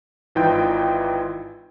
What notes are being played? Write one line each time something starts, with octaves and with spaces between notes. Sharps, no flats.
G#1 E3 D#4 F4 G5 G6